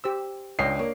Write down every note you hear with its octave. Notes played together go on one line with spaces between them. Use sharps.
G4 C5 E6
C#2 D4 C#5 D#5 G5 C7
A#3 C#5